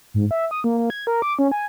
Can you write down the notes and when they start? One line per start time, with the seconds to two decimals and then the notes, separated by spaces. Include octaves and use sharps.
0.14 G#2
0.31 E5
0.51 D#6
0.64 A#3
0.78 A#3
0.90 G#6
1.07 A#4
1.22 D6
1.39 C#4
1.52 G#5